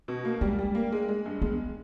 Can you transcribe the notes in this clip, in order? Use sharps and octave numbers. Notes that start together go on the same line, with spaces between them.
B2
A#3
G3 G#3
G3
A#3
G#3
G#3
G2
G#3 B3